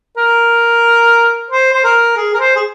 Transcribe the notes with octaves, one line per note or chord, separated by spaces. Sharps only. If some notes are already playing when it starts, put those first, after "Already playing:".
A#4
C5
C5
A#4
G#4
A#4
C5
G#4